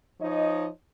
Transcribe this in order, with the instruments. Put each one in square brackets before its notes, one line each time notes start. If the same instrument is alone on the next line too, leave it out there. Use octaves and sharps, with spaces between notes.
[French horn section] F3 D#4 C#5 D#5